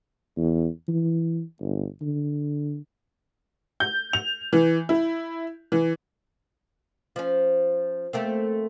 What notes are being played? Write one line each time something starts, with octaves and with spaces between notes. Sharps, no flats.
E2
E3
G1
D3
G6
F7
E3
E4
E3
F3 C#4
A3 A#3 C4